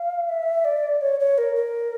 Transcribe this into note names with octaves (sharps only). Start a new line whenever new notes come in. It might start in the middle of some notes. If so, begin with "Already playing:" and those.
Already playing: F5
E5
D5
C#5
C#5
A#4
A#4